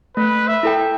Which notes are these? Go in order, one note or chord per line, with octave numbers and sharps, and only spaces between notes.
A3 B4
E5
E4 A4 G5